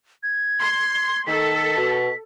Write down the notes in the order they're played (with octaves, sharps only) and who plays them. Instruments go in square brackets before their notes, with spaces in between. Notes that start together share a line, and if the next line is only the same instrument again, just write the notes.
[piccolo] G#6
[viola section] C6
[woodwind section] D#3 [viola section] A4 [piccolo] B6
[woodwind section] B2